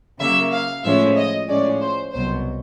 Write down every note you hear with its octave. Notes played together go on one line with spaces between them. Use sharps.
C#3 F#3 A#3 E5
F5
A2 F3 G#3 C#4 E5
D#5
A2 F3 G#3 C#4 D5
C5
C2 B2 F#3 C5